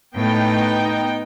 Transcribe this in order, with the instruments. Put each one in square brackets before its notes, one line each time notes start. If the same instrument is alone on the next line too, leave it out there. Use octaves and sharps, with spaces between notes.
[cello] A2 [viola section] B3 D#4 G5